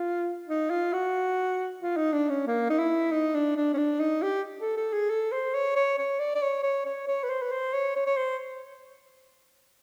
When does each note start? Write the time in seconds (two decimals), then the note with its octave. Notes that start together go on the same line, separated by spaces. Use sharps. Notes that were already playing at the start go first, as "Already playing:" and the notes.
Already playing: F4
0.48 D#4
0.70 F4
0.93 F#4
1.80 F4
1.97 D#4
2.13 D4
2.29 C#4
2.47 A#3
2.70 D#4
2.79 E4
3.12 D#4
3.35 D4
3.56 D4
3.73 C#4
3.77 D4
3.99 D#4
4.22 G4
4.61 A4
4.77 A4
4.93 G#4
5.10 A4
5.32 C5
5.54 C#5
5.75 C#5
5.98 C#5
6.19 D5
6.35 D5
6.42 C#5
6.63 C#5
6.85 C#5
7.07 C#5
7.24 B4
7.30 C5
7.42 B4
7.52 C5
7.73 C#5
7.96 C#5
8.06 C#5
8.17 C5